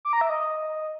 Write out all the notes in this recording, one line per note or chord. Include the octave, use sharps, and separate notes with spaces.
D6
A#5
E5
D#5